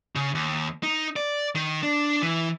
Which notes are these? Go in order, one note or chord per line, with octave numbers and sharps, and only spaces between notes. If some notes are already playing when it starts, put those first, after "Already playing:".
C#3
D#2
D#4
D5
D#3
D4
E3